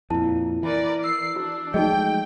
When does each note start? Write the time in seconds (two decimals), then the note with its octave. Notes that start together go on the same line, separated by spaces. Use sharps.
0.10 F2 A#2 E4 A5
0.63 E3 A#4 B4 D5
1.04 E6 C7
1.36 D4 F#4
1.74 F3 G#3 A3 D#4 F#4 G#4 D#5 G5